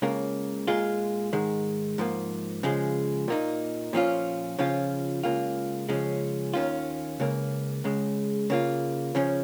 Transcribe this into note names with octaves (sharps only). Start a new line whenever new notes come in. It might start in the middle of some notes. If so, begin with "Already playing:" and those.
C#2 C#3 A#3
A#2 G#3 F4
G#2 D#3 G#3
G#2 F3 A#3
C#3 F3 G#3
A#2 A#3 D#4
A#2 F3 C#4 F4
C#3 F3 C#4 F4
C#2 C#3 A#3 F4
C#3 F3 G#3 C#4
D#2 D#3 C#4 F4
C#2 C#3 A#3
C#2 C#3 G#3
C#3 A#3 F4
C#3 F3 C#4